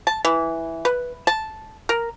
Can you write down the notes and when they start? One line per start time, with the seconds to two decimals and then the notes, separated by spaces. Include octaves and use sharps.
0.07 A5
0.25 E3
0.85 B4
1.27 A5
1.89 A#4